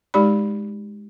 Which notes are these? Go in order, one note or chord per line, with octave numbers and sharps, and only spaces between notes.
G#3 D#4 G4 D5 B5